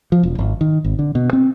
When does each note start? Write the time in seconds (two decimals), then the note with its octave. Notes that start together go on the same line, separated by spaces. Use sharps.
0.12 F3
0.23 E1
0.38 G#1
0.61 D#3
0.84 G#1
0.99 D3
1.15 B2
1.33 C4